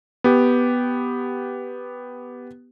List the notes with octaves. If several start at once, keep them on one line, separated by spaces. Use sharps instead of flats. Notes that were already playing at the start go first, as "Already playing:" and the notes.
B3 G4